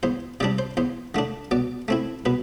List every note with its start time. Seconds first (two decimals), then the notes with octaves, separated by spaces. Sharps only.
0.03 E2 C5
0.40 C3 G3 D4 D5
0.58 C5
0.77 E2 C5
1.15 D3 A3 D4
1.51 B2 D5
1.88 A3 C4 E4
2.26 B2 B4